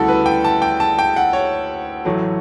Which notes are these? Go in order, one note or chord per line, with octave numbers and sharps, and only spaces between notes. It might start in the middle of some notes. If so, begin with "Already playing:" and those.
Already playing: D2 C#3 G3 E4 F#4 A4
B4
G5
A5
G5
A5
G5
F#5
C#5
A1 A2 F#3 A3